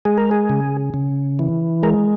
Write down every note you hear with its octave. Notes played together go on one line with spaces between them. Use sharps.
G#3 G#4
A#4
G#4
C#3
C#3
E3
G#3 A#4